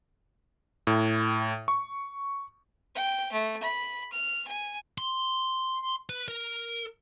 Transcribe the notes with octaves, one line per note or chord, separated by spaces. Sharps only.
A2
C#6
G5
A3
B5
F6
G#5
C6
B4
A#4